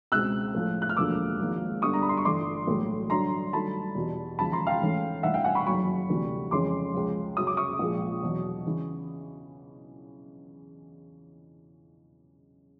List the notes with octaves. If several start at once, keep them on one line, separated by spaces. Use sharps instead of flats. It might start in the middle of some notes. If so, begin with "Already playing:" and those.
C#2 B2 G#3 C4 E6 F#6
A2 F3 A3
F#6
F6
E1 D2 D3 F3 A#3 D6 E6
G#1 G#2 F3 A#3
G2 D3 G3 B3 C#6 D#6
A#5
B5
C6
C#6
G1 G2 E3 A3 C6 D6
B1 A2 E3 G#3
G2 D3 F#3 A#5 C6
G2 D#3 F#3 A3 A5 B5
E2 B2 G3
E1 D#2 C#3 F3 A5 B5
A#5 C6
F5 G5
A1 G#2 E3 A3 C#4
A1 G2 E3 E5 F#5
F5 G5
F#5 G#5
B5 C#6
F#1 F#2 D#3 F#3 B5 C#6
D2 C3 E3 G3
F2 C#3 E3 G#3 C#4 C6 D6
C#2 C#3 F3
F#2 C#3 F#3 D#6
D6
C#6 D#6
A#1 A#2 F3 G#3
E2 B2 F#3
C#3 E3